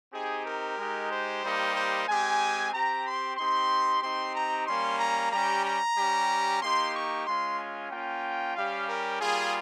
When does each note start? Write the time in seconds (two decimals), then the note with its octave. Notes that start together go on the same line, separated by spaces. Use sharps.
0.13 C4 D#4 G4 G#4
0.45 A#4
0.78 G#3 D#4 G4
1.11 C5
1.43 G3 A#3 D#4 G4
1.76 C5
2.07 G#3 C4 G4 G#5
2.73 C4 G4 A#5
3.05 C6
3.37 C4 D#4 G4 C6
4.02 C4 D#4 G4 C6
4.35 A#5
4.67 G3 A#3 C#4 C6
4.99 A#5
5.31 G3 C#4 G4 A#5
5.64 A#5
5.96 G3 C#4 G4
6.62 A#3 D#4 G4 C6
6.94 C#6
7.27 G#3 C#4 F4 C6
7.58 G#5
7.91 A#3 C#4 F4 G5
8.56 G3 C#4 G4 F5
8.88 A#4
9.21 G3 A#3 F4 G#4